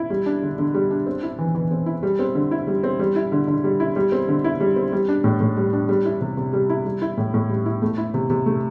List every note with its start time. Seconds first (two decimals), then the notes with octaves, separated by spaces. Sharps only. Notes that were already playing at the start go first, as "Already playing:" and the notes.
Already playing: E4
0.10 G3
0.26 D4
0.42 D3
0.58 D3
0.74 G3
0.91 D4
1.06 C4
1.23 E4
1.39 E3
1.55 E3
1.71 C4
1.86 E4
2.03 G3
2.19 C4
2.35 D3
2.51 E4
2.67 G3
2.83 C4
2.99 G3
3.16 E4
3.32 D3
3.47 D3
3.64 G3
3.80 E4
3.96 G3
4.12 C4
4.28 D3
4.44 E4
4.60 G3
4.76 C4
4.92 G3
5.08 D4
5.24 A2
5.41 A2
5.57 G3
5.73 D4
5.89 G3
6.05 E4
6.21 C3
6.37 C3
6.53 G3
6.69 E4
6.85 G3
7.02 E4
7.17 A2
7.34 A2
7.49 G3
7.66 E4
7.82 A3
7.98 E4
8.14 C3
8.30 C3
8.46 A3